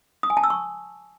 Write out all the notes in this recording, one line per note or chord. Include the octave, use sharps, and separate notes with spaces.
D#6
G#5
A5
E6
C#6